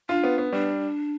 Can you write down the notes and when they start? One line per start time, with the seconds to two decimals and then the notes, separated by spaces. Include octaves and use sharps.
0.09 D4 F4
0.24 B3
0.38 B3
0.53 G3 D4